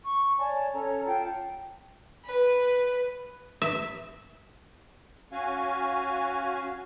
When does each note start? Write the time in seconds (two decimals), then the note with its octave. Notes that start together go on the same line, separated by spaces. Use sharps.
0.04 C#6
0.38 C#5 D5 G#5 A5
0.73 C#4 A4 C#5 A#5
1.06 F4 F#5 G5 A5
2.26 B4
3.62 E5
5.32 C#4 F#4 F5 G#5